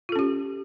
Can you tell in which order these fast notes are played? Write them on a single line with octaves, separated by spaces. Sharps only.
F4 A4 C#4 G4